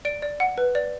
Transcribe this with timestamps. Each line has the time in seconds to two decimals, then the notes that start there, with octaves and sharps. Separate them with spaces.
0.05 D5 D7
0.22 D5
0.40 F#5
0.58 B4
0.75 D5